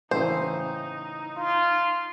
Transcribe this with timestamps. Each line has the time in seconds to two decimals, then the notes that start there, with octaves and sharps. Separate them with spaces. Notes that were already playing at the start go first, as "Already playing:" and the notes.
0.11 A2 C#3 E3 D#4 C5
1.36 F4